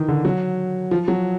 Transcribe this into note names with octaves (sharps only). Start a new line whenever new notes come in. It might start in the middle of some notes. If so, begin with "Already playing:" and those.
Already playing: D#3 E3
D3
F#3
F3
F#3